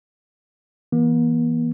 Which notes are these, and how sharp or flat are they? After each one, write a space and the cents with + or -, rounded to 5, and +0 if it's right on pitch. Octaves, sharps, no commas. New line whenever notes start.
E3 +0 A#3 +45